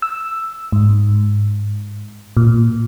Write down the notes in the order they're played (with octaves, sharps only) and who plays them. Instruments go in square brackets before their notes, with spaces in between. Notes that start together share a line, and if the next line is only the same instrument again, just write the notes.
[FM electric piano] E6
G#2
A#2